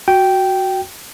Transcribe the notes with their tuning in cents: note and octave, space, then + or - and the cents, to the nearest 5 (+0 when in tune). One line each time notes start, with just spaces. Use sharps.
F#4 +0 G5 -10